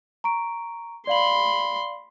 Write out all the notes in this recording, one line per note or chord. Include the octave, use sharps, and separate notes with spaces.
A#5 C#6 D7
D5 F5 B5 C6 F#7